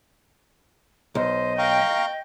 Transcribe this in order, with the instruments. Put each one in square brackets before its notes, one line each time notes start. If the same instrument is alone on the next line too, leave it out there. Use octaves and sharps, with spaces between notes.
[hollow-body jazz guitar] B1 [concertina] C5 [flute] D#5
[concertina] F5 A#5 C#6 [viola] G5